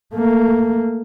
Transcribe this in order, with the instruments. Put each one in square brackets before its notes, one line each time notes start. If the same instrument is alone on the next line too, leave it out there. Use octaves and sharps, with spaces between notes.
[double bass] A3 A#3